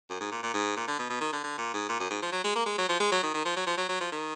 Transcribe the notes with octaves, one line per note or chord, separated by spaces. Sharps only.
F#2
G#2
A#2
A#2
G#2
A#2
D3
B2
B2
D#3
D3
D3
A#2
G#2
A#2
F#2
G#2
F3
F#3
G#3
A#3
G#3
F#3
F3
G#3
F#3
D#3
D#3
F3
F#3
F3
F#3
F#3
F3
D#3